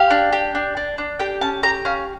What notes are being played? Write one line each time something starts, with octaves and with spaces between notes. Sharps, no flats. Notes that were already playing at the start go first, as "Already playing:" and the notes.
Already playing: G4 F5
D4
G4
D4
D4
D4
G4 G5
C#4 A5
G4 A#5
C#4 F5